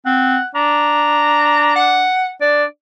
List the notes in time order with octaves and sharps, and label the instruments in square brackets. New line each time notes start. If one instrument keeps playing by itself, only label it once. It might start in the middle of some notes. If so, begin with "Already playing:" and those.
[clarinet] C4 [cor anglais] F#5
[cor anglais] D4 [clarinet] A#5
[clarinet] F#5
[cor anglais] D4 [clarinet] D5